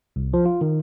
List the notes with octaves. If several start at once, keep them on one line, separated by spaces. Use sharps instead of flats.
C2
F3
F4
D#3